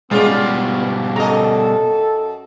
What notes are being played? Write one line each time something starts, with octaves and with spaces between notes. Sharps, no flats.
B2 G3 G#3 B3 C#4 F4 D5
F#2 A4 D#5 A#5